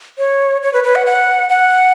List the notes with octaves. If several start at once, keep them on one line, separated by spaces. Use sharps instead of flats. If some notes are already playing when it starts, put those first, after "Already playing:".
C#5
C#5
B4
B4
F#5
F#5
F#5